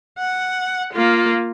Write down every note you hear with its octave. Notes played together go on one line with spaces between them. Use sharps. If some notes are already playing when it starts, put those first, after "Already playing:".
F#5
A#3 F4